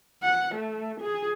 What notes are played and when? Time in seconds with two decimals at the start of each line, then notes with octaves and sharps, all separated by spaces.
0.23 F#5
0.55 A3
1.01 G#4